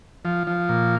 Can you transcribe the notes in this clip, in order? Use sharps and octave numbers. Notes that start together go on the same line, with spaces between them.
F3
F3
A#2